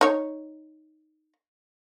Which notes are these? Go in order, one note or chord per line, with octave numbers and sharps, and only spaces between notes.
D#4 C#5